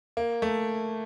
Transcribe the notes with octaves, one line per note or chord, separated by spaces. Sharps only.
A#3
A3